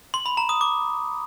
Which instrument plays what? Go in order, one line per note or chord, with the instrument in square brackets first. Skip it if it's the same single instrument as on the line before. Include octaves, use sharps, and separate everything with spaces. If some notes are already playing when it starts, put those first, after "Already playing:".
[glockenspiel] C6
B5
A#5
D#6
D6